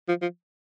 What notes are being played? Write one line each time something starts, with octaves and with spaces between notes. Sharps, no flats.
F3
F3